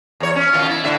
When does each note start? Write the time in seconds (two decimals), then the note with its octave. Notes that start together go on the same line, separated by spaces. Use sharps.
0.20 E2 C#5
0.35 C#4
0.53 B2 D#3 F4
0.68 E4
0.84 A2 D3 E5